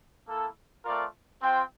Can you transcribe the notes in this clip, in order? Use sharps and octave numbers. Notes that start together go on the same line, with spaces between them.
A#3 E4 A4
A3 C4 F4 A#4 D5
C4 F4 C5 G5